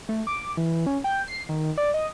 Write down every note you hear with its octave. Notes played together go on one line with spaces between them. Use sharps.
A3
D6
E3
C#4
G5
C7
D#3
D5
D#5